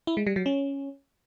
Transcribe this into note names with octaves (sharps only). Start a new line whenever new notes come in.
E4
G#3
G3
F#3
C#4